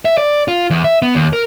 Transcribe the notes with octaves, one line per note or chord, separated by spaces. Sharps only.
E5
D5
F4
E2
E5
B3
D#2
A#4